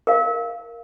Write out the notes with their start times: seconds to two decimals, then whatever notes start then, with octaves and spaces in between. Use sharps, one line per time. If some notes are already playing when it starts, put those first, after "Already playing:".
0.07 A#4 F5